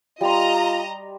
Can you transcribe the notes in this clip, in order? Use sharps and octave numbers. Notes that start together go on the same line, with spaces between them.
G3 F4 D#5 A#5 C6